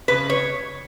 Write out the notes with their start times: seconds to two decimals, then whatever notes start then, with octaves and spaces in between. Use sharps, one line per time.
0.08 C#3 B4
0.30 C#5